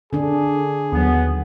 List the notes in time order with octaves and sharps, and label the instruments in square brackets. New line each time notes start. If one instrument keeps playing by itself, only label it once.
[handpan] D3 D4 [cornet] G#4
[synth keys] D#2 F#3 [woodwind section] B3